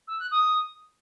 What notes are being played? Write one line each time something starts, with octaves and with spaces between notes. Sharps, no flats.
E6
F#6
D#6